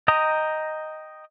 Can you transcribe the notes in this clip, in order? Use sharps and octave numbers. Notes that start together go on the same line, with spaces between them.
D#5 G5 A#5 D#6